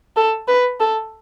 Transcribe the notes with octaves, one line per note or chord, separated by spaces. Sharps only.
A4
B4
A4